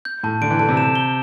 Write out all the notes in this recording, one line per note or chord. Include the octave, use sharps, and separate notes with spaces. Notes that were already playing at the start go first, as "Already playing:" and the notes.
G6
A2 A5
D3 D7
E3
D3 A5
C3
E7
G7